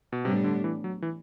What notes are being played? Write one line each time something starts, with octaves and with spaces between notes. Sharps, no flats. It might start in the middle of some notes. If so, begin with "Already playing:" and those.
B2
A2 C3 G3 B3 D4
D3
E3
F#3
E3